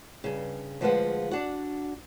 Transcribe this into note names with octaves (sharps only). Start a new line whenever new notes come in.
G2 C#3
D2 F3 G#3 F4 B4 F#5
D4 F#4